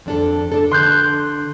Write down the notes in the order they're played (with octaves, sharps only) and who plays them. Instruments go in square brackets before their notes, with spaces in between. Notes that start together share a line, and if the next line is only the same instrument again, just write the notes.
[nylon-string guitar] F2 D4 A4
D4 A4
[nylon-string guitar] D3 [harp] C6 F#6 G6